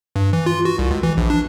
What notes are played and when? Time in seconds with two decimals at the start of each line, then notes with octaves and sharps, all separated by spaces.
0.16 G2
0.33 E3
0.46 F4
0.65 F#4
0.78 C2
0.91 C#2
1.03 E3
1.17 A#1
1.30 D4